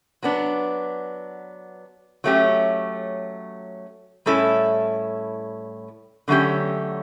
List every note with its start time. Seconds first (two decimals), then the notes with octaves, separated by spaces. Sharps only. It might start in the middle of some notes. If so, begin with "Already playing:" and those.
0.23 F#3 B3 D4
2.24 F#3 A3 C#4 G4
4.26 A2 G3 C#4 E4 A4
6.28 D3 F#3 A3 C#4 G4